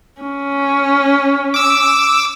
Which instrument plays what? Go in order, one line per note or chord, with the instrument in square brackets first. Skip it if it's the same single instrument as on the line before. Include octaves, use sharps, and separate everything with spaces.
[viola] C#4
[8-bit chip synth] D6 E6